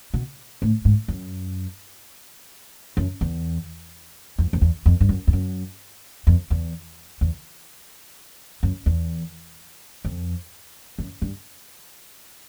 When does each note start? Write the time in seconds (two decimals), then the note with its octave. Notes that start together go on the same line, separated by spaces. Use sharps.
0.14 B2
0.62 A2
0.85 G#2
1.08 F#2
2.97 F#2
3.21 E2
4.38 F2
4.53 F2
4.61 E2
4.86 F2
5.01 G2
5.09 F#2
5.27 F2
5.33 F#2
6.27 F2
6.50 E2
7.21 E2
8.63 F#2
8.86 E2
10.05 F2
10.99 F#2
11.22 G2